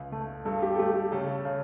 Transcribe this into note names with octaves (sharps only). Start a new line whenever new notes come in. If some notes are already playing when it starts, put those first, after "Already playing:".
Already playing: C#2
A3
G2 A4
G4
A4
A3 G4
G4
C#3 A4
C#3